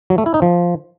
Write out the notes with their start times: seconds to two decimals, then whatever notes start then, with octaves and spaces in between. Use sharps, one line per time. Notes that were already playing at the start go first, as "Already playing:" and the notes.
0.10 F#3
0.18 A3
0.26 E4
0.34 D#4
0.42 F3